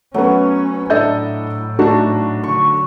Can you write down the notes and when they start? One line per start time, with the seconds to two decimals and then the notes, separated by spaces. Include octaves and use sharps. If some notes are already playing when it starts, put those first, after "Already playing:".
0.14 F#3 A3 B3 C#4
0.90 A2 D4 A4 D#5 E5 G6
1.79 A3 D4 D#4 F#4 A5
2.43 D3 C#6